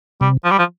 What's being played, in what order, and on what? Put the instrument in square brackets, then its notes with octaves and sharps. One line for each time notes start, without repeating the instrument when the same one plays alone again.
[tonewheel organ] C3 [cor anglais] G3
[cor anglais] F3
G3
F3